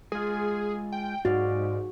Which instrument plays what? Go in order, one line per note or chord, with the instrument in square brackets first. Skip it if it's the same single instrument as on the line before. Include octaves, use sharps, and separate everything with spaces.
[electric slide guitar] G#3 F4 [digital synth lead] G#4
[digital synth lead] G5
[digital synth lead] G#2 [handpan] F#4 [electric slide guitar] D5 F5